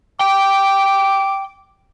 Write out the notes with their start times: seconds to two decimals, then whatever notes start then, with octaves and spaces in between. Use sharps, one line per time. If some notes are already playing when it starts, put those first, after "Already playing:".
0.21 G5 D6